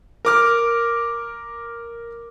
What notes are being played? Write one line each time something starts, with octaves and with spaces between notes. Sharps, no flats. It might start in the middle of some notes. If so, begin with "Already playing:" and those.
A#4 D6 F6